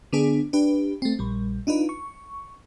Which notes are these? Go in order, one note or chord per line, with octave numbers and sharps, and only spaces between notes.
D3 B3 D4 G#4
D4 G4 B4
A3 C4
A#1 G3
D4 D#4 F4 B4
C#6